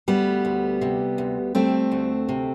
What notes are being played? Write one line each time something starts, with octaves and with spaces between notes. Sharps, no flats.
D2 G3 B3
D2
C3
D2
G3 A3 C4
D2
C3